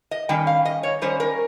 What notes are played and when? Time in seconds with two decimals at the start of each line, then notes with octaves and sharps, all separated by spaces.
0.11 D#5
0.29 D#3 G3 C#4 G5
0.47 F5
0.65 D#5
0.83 C#5
1.01 D#3 G3 C#4 C5
1.20 A#4